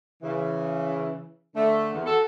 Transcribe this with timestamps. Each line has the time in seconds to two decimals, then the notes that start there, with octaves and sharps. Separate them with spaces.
0.23 C#3 E3
1.56 D3 A3
1.94 E2
2.06 F#4 A4